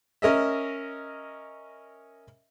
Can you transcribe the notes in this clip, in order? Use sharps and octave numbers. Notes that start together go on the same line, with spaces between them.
C#4 A#4 D#5 E5